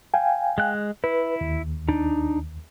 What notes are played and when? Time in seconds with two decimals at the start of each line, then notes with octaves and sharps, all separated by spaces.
0.14 F5 G5 G#5
0.58 G#3 F#6
1.04 E4 B4
1.41 D#2
1.89 D4 D#4